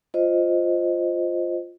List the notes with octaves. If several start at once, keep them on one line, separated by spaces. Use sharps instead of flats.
F4 C5 D#5